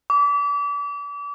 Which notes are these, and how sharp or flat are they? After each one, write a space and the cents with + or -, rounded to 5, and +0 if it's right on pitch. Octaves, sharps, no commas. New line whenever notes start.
D6 -35